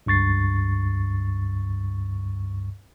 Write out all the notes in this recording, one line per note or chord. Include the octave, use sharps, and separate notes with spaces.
C#2 G2 C#6 A6 C7